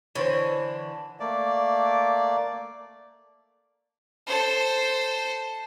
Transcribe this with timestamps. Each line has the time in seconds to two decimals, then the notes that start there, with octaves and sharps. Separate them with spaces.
0.15 D3 E3 C5 C#5
1.20 A3 A#3 D5
4.27 A4 C5